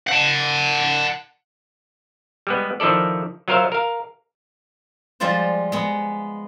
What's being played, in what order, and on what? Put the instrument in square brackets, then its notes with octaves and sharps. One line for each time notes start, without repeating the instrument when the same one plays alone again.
[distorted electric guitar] F#5 A5
[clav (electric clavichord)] G3 G#3 B3
D#3 F3 E4 A4 D5
F#3 F4 A#4 C5 E5 F5
A#4 F5
[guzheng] F3 G3 G#3 F4 C5
G#3 B3